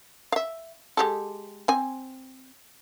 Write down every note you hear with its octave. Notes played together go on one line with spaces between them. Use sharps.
E5 F5
G#3 G4 A4
C4 G#5